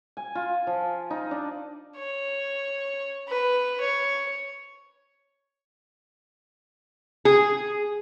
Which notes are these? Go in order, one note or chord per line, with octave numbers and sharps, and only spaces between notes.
G#5
F4
F3
D#4
D4
C#5
B4
C#5
G#4